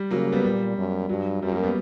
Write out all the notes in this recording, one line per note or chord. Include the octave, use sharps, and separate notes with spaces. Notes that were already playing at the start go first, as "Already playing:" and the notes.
Already playing: G3
C#3 F#3 A#3
G3 B3
A#2 G3
F#2
G2 F#3
F#2 G3
F#3 A#3
G3 B3